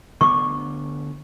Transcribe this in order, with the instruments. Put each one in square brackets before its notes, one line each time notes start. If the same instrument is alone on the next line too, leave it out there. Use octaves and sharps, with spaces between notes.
[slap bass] D2 D3 B3 [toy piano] C#6 D6